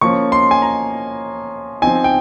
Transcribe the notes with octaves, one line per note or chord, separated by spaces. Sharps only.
F3 A#3 C#4 C#6
C6
G#5
A#5
F3 C4 D#4 G#5
G5